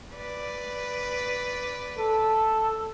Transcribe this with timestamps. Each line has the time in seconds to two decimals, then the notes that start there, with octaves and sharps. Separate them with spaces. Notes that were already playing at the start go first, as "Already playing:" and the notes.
0.14 B4 D5
1.98 A4